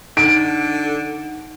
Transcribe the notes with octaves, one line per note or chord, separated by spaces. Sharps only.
D3 D#4 F#5 D7